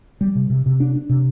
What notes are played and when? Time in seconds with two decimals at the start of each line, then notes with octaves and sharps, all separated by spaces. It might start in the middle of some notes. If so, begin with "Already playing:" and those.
0.21 G3
0.35 C3
0.50 C3
0.66 C3
0.80 D4
0.95 D4
1.09 C3